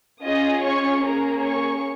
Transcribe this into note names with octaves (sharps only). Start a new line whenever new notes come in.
C#4 F4 G#4 D#5 D#6
C#5 C#6
A#3 C#4 G#4 A#4 A#5
C#5 C#6